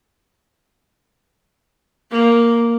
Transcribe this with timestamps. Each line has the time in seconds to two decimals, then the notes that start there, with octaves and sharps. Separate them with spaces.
2.11 A#3